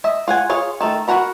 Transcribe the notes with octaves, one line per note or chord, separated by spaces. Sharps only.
D#5 E5
F4 F#5 G#5
F4 G#4 C#5
D#3 A3 A4
F#4 A#4 F#5 A#5 B5